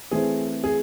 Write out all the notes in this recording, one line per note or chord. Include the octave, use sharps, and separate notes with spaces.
E3 A3 C4 E4 G#4
G#4